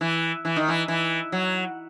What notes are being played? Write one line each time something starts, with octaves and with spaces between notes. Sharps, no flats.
E3
E3
D#3
E3
E3
F#3